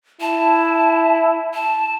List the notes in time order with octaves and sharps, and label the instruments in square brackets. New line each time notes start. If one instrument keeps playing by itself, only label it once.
[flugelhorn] E4 [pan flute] A5
[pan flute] A5